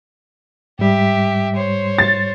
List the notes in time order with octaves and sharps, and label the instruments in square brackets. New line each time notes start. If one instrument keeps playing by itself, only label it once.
[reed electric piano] G#2 G3 [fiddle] G4 E5
[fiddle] C5 C#5
[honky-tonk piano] A6